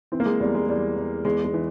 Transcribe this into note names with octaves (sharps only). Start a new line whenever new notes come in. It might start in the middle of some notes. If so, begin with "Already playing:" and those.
E3 C4
A#3
G#3
E2 G3
G#3
E2 G3
E2
E2 G#3
G#3
E3